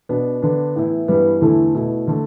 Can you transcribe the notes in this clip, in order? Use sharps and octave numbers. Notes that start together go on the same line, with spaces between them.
B2 B3 D4
D3 B3 D4
A2 E3 B3 E4
G2 E3 G3 B3
E2 D3 A3 E4
B2 A3 E4
D3 A3